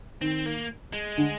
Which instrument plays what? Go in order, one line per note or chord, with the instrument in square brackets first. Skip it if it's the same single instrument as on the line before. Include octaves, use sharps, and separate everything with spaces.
[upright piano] D#3 [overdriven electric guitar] C4
[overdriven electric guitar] A#3
G#3
[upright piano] D3